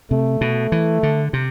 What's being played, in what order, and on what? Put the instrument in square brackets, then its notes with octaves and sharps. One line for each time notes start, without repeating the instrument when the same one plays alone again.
[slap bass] C3 [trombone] A3
[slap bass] B2
E3
D3
C3